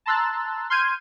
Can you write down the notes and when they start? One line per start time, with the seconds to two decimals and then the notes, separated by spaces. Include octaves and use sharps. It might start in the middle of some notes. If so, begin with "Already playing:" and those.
0.06 A5 A#5 C6 E6 F#6 A6
0.70 C6 F6 G6 G#6 D#7